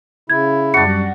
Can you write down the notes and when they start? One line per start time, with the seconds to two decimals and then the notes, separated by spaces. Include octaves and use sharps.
0.30 C#3 E4 G#6
0.74 F#2 G3 D4 F#4 C#7